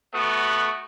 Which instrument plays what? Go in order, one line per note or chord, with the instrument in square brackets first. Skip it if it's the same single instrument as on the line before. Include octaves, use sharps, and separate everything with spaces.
[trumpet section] A3 B3 F#4